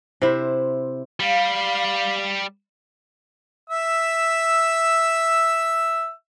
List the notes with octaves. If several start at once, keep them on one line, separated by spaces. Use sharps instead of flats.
C3 E4 C5
G3 F5
E5 E6